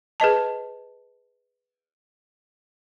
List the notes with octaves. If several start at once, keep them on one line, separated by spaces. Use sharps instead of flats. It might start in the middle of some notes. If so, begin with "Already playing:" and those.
G#4 B4 D#5 A5